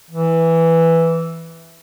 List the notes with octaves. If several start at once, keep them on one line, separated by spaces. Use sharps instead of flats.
E3